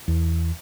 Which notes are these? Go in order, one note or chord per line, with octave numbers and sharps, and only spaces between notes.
E2